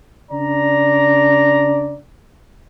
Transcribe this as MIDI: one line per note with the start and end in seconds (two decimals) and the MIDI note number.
0.31 1.99 49
0.31 1.99 62
0.31 1.99 74
0.31 1.99 82